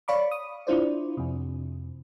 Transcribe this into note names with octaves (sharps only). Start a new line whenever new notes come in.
C#5 D5 F5 B5 C#6 D6
D#6
D4 E4 F4 C5 D5
F2 C3